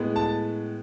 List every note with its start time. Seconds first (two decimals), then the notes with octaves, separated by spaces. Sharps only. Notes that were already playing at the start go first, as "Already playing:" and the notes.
Already playing: A2 G#3 B3
0.16 A5